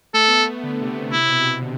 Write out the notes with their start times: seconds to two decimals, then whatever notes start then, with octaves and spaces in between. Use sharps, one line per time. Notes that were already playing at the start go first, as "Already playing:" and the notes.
0.14 A3 A4
0.28 B3
0.41 A3
0.64 D3
0.82 C3
0.89 D3
1.12 C3 E4
1.29 B2
1.45 C3
1.62 D3